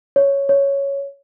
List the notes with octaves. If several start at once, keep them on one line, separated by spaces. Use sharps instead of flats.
C#5
C#5